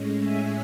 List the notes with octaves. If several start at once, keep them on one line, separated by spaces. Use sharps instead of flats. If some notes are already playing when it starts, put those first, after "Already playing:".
Already playing: A2 G#3 C#4
E5 G#5